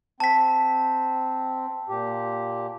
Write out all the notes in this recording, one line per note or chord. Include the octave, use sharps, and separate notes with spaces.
C4 A5 B6
A#2 G4